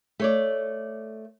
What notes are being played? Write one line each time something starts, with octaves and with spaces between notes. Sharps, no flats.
A3 C#5 D5